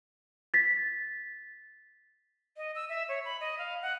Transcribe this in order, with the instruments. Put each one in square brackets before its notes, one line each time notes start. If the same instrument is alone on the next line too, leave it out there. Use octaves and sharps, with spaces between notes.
[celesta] A6 B6
[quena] D#5
E6
E5
C#5
B5
D#5
F5
F#5